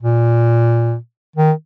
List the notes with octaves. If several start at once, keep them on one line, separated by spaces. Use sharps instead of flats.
A#2
D#3